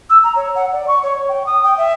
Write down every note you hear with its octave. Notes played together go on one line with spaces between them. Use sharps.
E6
A#5
C#5
F#5
D5
C#6
C#5
G5
D#6
G5
E5